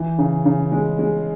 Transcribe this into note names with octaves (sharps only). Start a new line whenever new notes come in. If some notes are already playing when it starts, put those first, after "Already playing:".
Already playing: E3
C#3
C#3
G#3
G#3